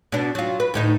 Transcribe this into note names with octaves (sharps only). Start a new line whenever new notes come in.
B2 D4
F#3 F4
B4
D2 A2 D#4